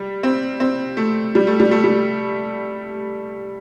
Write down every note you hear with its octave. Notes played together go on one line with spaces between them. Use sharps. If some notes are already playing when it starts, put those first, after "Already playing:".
Already playing: G3
C4
C4
A3
G3
A3
G3
A3
G3